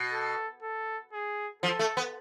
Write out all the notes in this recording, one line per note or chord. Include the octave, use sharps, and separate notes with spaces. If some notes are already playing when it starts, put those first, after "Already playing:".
Already playing: B2
A4
A4
G#4
F3 A4
A3
B3